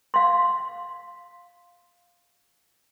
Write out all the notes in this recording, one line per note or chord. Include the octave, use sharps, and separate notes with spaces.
F5 C6